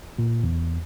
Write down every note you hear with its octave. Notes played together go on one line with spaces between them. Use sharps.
A#2
E2